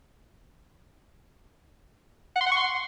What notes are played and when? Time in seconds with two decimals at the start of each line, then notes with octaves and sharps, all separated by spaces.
2.36 F#5
2.41 C6
2.46 F#5
2.52 C#6
2.57 C6